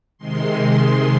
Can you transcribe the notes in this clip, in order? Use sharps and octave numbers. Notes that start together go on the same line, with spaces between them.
C3 D#3 G#3 C6